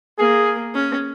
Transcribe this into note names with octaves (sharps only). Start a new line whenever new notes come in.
A#3 G#4
C#4